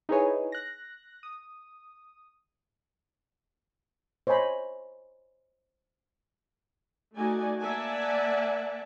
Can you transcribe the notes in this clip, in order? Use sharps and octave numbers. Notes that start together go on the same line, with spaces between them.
D#4 E4 G#4 B4 C#5 G#5
F#6 A#6
D#6
C5 C#5 D#5 G#5 B5 C6
A3 D#4 F#4 D5 G#5
A#3 D5 E5 F#5 G#5 A5